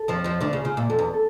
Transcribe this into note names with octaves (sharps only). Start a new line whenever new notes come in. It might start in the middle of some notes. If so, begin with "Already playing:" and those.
Already playing: A4
F2 F3
C#5
F2 F3
D2 D3 F4
C#3
C#3 F4
A#2
F2 A4
E2
A4